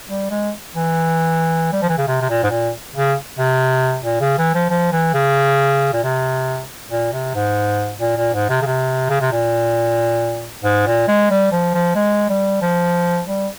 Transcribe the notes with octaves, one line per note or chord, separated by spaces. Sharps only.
G3
G#3
E3
G3
F3
E3
C#3
C3
C3
A#2
G#2
A#2
C#3
C3
A#2
C#3
E3
F3
F3
E3
C#3
A#2
C3
A#2
C3
G#2
A#2
A#2
G#2
C3
C#3
C3
C#3
C3
A#2
G#2
A#2
G#3
G3
F3
F3
G#3
G3
F3
G3